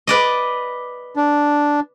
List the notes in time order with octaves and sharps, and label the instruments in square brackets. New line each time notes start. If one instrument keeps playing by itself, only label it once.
[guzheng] B4 D5 D#5
[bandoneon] D4